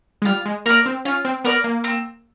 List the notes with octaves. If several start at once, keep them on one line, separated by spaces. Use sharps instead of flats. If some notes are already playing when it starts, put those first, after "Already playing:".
G#3
G3 F4
G#3
A#3 A#4 D5
C4
C#4 F4
C4
B3 A#4 D5
A#3
C4